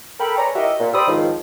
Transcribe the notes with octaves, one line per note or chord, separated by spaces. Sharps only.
A4 A#4 G5 B5
B4 C#5 D5 G#5 A#5
E4 F#4 G4 A#4 D#5 E5
A#2
G4 C5 D5 B5 D#6 E6
C#2 G#2 D#3 F3